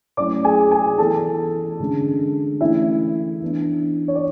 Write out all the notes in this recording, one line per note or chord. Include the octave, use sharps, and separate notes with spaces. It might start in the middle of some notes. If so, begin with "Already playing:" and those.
F#3 A3 C#4 E4 D5 D6
G#4 G#5
G#4 G#5
E3 B3 E4 A4 A5
D3 G#3 C#4
E3 A3 C#4 E4 E5
E3 B3 D4
C#5
D5